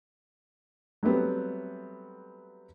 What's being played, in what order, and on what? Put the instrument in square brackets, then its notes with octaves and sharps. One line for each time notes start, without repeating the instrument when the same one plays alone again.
[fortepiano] F#3 G3 A3 B3 C4